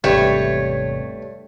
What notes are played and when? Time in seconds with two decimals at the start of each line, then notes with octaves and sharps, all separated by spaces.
0.04 G#1 E2 G2 C3 A3 G4 B4 C#5